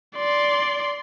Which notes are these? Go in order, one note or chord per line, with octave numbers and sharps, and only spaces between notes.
D5 C6